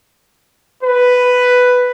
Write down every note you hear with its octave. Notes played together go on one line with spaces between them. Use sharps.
B4